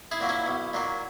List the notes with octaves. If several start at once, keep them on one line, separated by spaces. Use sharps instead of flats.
E4 G#4
A#2 F#3 A#3
C#4 E4
B1
A#2 F#3 A#3